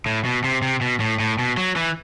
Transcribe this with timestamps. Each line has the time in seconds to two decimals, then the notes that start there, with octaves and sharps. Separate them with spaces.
0.06 A2
0.25 B2
0.44 C3
0.62 C3
0.81 B2
1.00 A2
1.20 A2
1.39 B2
1.57 F#3
1.76 E3